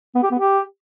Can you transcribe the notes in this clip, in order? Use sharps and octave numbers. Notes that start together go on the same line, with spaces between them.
B3
G4
B3
G4